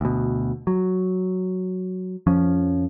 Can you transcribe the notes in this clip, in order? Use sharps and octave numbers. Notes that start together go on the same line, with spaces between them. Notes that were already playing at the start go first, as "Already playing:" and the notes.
D2 B2
F#3
F2 F3 C#4